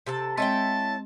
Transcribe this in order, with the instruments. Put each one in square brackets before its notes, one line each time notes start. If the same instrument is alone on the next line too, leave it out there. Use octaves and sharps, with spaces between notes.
[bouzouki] C3 A4 A5 [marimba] G4
[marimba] G#3 C4 D#5 [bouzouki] E4 C#5 G5 [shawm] A5